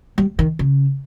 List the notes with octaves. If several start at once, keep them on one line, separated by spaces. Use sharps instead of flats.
G3
D#3
C#3